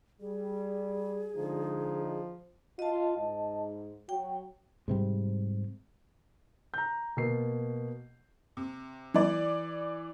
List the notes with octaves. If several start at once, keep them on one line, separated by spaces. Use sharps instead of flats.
G3 G#4
D3 F3 G#3 D#4
F4 D#5 A5
G#2
F#3 F#4 G5
G#2 C3 G3
A#5 G6
B2 A#3 C7
C3
E3 D5